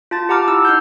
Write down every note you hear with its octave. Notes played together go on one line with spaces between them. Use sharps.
F4 A5 A6
G4 F#5 A5 A#5 D6 F6
E4 E6
D#4 F6 G6